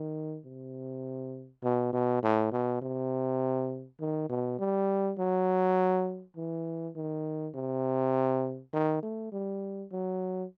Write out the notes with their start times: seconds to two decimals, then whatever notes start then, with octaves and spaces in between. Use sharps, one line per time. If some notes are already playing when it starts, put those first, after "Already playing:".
Already playing: D#3
0.45 C3
1.63 B2
1.93 B2
2.22 A2
2.52 B2
2.82 C3
4.00 D#3
4.29 B2
4.59 G3
5.19 F#3
6.36 E3
6.96 D#3
7.55 C3
8.73 D#3
9.03 A3
9.32 G3
9.92 F#3